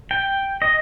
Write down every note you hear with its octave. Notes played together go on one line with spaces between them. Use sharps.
G5
D#5